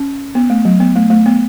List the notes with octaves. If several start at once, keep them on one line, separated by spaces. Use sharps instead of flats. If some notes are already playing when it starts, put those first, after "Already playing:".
Already playing: C#4
B3
A3
F#3
B3
A3
A3
B3